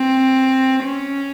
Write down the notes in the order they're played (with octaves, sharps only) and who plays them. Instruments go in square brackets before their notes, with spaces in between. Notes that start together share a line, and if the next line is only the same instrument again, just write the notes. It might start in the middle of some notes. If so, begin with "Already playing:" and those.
Already playing: [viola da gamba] C4
C#4